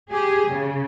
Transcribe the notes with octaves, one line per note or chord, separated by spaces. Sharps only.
G4 G#4
C#3